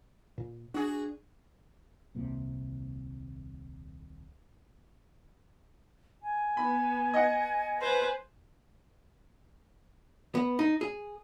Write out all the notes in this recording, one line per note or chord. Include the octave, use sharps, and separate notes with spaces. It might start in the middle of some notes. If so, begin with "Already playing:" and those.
A#2
D4 F#4 G#4
D#1 C2 C3 A#3
G#5
B3 B5
D#5 F#5
B4 C5
B3
D#4
G#4